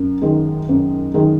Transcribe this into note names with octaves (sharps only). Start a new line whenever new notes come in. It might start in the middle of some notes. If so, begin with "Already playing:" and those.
Already playing: F#2
D#3 G#3
F#2
D#3 G#3